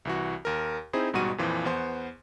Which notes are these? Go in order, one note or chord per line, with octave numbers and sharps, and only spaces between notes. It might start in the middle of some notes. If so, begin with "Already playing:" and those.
C2 E3 F#4
D#2 A#4
C4 D#4 E4 G#4 C5
A1 G#2 B2 G3 F#4 D#7
F2 A#2 E3 F3
E2 B3 C5 C6